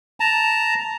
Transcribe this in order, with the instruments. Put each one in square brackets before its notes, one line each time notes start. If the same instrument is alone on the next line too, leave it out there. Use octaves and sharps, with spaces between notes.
[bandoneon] A5 A#5